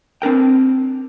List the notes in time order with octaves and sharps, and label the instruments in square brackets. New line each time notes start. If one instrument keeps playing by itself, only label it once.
[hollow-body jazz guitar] C4 D4 A#4 G5